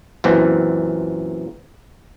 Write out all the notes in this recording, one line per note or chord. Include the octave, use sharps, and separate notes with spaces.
F#2 A#2 E3 C4